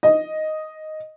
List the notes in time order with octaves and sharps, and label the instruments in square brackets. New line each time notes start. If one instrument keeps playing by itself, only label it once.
[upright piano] D#5